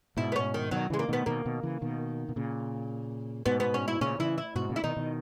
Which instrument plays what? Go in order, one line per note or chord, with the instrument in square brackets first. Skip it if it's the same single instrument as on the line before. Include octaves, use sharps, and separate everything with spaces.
[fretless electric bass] G#2 B2 [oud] E4
[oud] B3
C#4
D#3
[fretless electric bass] B2 D#3 [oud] F#3
[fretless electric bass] C#3 E3 [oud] G#3
[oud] A#3
[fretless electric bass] B2 D#3 [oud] B3
[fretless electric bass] B2 D#3 [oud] A#3
[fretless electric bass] B2 D#3
C#3 E3
B2 D#3
B2
A#2 C#3
[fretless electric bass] G#2 B2 [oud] B3
[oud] B3
C#4
E4
[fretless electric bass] A#2 C#3 [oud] C#4
[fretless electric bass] C#3 E3 [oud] E4
[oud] E4
[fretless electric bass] G#2 B2 [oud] F#4
[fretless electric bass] A#2 C#3
[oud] E4
[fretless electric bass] B2 D#3 [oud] D#4
[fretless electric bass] B2 D#3